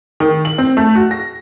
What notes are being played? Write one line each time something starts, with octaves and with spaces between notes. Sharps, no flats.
D#3
F#7
C4
A3
F#4
A#6